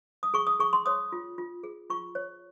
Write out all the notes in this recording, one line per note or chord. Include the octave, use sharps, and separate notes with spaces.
D#6
G#4 C#6
D#6
G#4 C#6
C6
C#5 D#6
F4
F4
G#4
F4 C#6
C#5